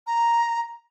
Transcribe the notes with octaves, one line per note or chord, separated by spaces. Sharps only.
A#5